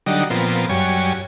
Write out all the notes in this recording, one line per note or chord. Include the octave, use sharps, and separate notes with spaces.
D3 F#3 G3 D#4
A#2 F3 B3 C4
F#2 G3 C#5 G#5